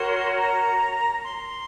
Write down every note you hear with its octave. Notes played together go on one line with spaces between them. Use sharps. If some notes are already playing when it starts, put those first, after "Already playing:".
Already playing: F#4 A#4 C#5 C6
A#5
C6